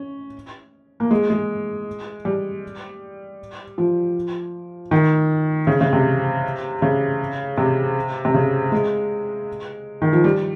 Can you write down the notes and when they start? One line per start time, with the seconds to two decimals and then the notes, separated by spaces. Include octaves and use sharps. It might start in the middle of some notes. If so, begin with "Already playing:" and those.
Already playing: C#4
1.00 A#3
1.11 G#3
1.30 G#3
2.25 G3
3.78 F3
4.91 D#3
5.67 C#3
5.81 C#3
5.93 C3
6.82 C#3
7.58 C3
8.25 C3
8.34 C#3
8.72 G#3
10.02 D#3
10.13 F3
10.24 G3